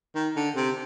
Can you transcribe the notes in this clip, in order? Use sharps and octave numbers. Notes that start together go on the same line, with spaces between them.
D#3
D3
C3